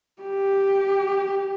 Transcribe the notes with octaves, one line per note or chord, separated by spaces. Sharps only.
G4